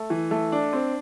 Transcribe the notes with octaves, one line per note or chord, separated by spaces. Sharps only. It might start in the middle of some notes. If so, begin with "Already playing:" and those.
Already playing: A3
E3
A3
D4
C4